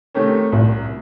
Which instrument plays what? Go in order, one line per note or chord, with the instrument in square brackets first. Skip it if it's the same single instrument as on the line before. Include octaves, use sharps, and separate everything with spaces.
[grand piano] C3 D#3 A3 C#4
[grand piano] C2 [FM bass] A2